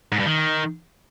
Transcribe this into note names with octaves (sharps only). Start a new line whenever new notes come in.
G#2
G2
D#3